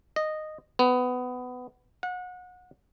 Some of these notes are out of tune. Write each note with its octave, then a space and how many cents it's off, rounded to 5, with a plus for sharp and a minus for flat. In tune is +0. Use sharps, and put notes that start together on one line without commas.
D#5 -10
B3 +20
F#5 -30